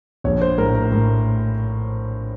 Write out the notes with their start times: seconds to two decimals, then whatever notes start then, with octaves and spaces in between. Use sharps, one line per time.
0.24 A#1 C#5
0.41 C5
0.58 A2 A#4
0.74 A#4
0.91 A2